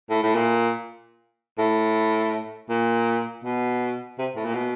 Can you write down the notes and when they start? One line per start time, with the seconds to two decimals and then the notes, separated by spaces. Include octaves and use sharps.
0.10 A2
0.23 A2
0.35 A#2
1.58 A2
2.70 A#2
3.44 B2
4.19 C3
4.36 A2
4.45 A#2
4.54 B2